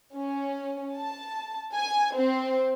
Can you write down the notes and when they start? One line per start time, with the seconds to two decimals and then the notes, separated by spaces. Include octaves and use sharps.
0.17 C#4
0.96 A5
1.74 G#5
2.16 C4